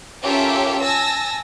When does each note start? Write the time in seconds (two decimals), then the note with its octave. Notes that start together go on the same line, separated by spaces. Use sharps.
0.23 C#4 F4 G4 A4 A#4 E5
0.82 G#5 A5 E6 A#6